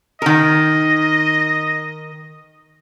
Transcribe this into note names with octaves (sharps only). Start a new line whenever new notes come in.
D#3 A#4 D#5